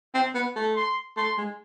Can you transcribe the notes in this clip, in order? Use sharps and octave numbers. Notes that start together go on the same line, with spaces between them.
C4
B3
A3
C6
A3 C6
G#3